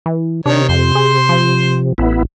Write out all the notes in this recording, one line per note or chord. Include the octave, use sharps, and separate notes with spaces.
E3
C3 D#3 D4 C#5
F2 C5 C6
G#4
F3
A1 B3 E4